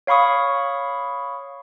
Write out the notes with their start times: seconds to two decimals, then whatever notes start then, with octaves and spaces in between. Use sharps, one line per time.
0.07 C#5 F5 B5 C#6 D#6